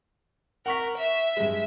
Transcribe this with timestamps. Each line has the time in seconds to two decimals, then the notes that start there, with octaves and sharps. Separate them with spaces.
0.66 A#4 F#5 C#6 B6
0.98 E5
1.37 G2 G#3